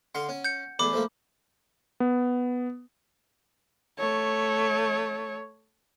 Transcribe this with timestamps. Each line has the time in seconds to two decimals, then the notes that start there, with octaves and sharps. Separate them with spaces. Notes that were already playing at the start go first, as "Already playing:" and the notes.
0.15 D3 F5 F#5 C6
0.29 C#4
0.44 G6 C#7
0.79 E2 A3 G#4 B5 D6
0.93 F3 A3 A#3
2.00 B3
3.99 A3 C#5